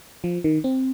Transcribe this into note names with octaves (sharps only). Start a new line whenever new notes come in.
F3
D#3
C4